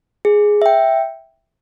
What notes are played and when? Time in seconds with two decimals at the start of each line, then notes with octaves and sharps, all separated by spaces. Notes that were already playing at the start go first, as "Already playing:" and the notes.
0.25 G#4
0.62 E5 G5